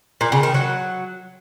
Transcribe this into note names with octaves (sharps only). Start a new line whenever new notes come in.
A#2
C#3
D#3
F#3